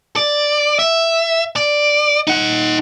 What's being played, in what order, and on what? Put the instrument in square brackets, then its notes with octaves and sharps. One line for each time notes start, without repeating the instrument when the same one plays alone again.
[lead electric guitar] D5
E5
D5
D#4 F#5